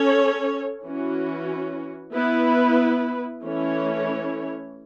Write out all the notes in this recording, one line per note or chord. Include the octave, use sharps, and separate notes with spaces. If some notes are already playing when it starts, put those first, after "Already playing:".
Already playing: C#4 A4 C#5
E3 C#4 F#4
B3 E4 B4
E3 A3 C#4 E4 C#5